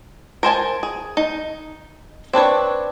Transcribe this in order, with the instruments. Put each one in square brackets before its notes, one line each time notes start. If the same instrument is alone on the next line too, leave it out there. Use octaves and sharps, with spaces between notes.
[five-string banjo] A#4 C5 G#5 A5
G#4
D#4
C4 D4 B4 C#5